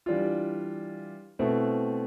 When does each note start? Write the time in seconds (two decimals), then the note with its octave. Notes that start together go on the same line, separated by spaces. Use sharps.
0.06 E3 G3 D4 F4
1.39 B2 A3 C4 E4 B4